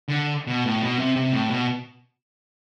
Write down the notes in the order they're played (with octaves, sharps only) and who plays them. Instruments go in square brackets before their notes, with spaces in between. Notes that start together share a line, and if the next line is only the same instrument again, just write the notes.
[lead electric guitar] D3
B2
A2
B2
C3
C3
A2
B2